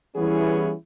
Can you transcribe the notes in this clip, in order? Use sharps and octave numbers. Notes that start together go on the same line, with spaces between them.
E3 G3 B3 C#4 E4 G#4